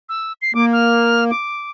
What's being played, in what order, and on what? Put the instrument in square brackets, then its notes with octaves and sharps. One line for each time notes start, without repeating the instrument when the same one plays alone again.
[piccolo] E6
C7
[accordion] A#3 [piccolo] D6
[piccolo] F6
D6